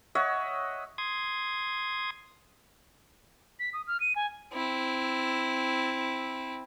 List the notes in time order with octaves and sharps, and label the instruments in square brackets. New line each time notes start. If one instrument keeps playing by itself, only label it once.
[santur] C#5 D#5 E5 F#5
[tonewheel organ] C6 D#6 G#6
[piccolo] B6
D#6
F6
D#7
G#5
[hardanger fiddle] C4 E4